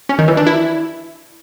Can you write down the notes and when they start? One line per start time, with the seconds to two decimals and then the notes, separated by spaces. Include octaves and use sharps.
0.09 C#4
0.19 D#3
0.28 E3
0.37 D4
0.46 E4